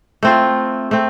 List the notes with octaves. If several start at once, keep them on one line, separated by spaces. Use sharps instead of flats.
A3 C4 F4
A3 C4